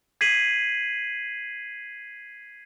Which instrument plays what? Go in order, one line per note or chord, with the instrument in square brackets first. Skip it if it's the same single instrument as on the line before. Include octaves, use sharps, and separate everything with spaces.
[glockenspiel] G#6 B6 C7 D#7 F#7